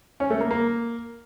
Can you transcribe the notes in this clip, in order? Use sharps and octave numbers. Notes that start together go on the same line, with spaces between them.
C#4
A3
A#3
A#3